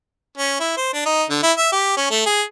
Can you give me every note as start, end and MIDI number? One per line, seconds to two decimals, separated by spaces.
0.38 0.58 61
0.60 0.72 64
0.77 0.89 72
0.93 1.02 62
1.05 1.23 63
1.30 1.42 50
1.43 1.52 64
1.57 1.68 76
1.72 1.96 67
1.97 2.08 61
2.10 2.22 57
2.26 2.42 68